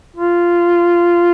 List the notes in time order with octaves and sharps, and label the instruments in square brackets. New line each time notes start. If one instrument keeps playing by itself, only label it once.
[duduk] F4